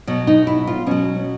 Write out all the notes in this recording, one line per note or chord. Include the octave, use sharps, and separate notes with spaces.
B2 F#3
D#4
E4
F4
B2 F#3 C#4